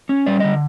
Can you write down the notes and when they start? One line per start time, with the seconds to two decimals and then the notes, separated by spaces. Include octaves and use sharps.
0.09 C#4
0.27 G3 D5
0.40 D3 D#5